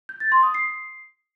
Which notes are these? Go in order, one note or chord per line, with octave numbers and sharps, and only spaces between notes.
G6
A6
C6
D#6
C7